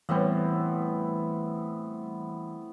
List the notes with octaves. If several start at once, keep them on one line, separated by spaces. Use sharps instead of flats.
A2 E3 G3 B3 C4